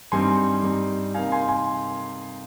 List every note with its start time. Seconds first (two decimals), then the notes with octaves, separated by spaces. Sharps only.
0.12 G2 G3 C4 D#4 G#5 C6
0.63 G2 G3 C4 D#4
1.14 C3 D#3 A#3 D#4 F5 G#5
1.32 G#5 C6
1.48 G#5 C6